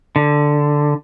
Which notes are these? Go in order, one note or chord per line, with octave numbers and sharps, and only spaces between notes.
D3